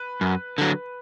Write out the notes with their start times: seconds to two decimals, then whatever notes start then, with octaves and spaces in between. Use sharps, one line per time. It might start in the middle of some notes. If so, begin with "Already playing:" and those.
Already playing: B4
0.21 F#2
0.58 D3 F#3